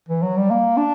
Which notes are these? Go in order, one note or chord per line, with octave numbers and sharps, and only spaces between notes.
E3
F#3
G3
A#3
D4